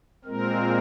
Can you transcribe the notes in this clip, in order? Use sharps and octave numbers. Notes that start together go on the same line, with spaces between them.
A#2 G#3 C4 A#4